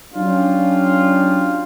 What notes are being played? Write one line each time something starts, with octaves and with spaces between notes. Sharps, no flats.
F#3 C#4 D4 F4 G4